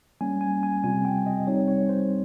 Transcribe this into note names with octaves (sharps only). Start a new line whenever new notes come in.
G3 A#3 C#4 G#5
G#5
G#5
C3 G3 C4 F4 G#5
G5
D#5
G3 C4 D#4 C#5
C#5
C5